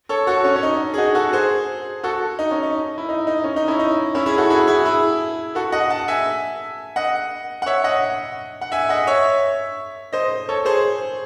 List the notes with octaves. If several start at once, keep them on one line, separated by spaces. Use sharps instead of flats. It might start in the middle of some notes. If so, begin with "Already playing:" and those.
A4 C#5
F#4 A4
C#4
C#4
D#4
G#4
D#4 F#4
F#4 A4
G#4 C5
F#4 A4
D#4
C#4
D#4
E4
D#4
D#4
C#4
D#4
C#4 E4
D#4
C#4 E4
E4 G#4
F#4 A4
E4 G#4
F#4
E4 G#4
E4 G#4
F#4 A4
D#5 F#5
F#5 A5
E5 G#5
D#5 F#5
F#5
C#5 E5
D#5 F#5
F#5
E5 G#5
D#5 F#5
C#5 E5
C5 D#5
A4 C#5
G#4 C5